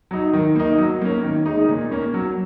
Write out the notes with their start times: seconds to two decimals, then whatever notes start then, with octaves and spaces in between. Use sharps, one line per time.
0.11 F#3 D#4
0.33 D#3
0.56 A#3 D#4
0.78 F#3
1.01 A#3 C#4
1.23 D#3
1.46 G#3 D#4
1.69 A#2
1.91 A#3 C#4
2.14 F#3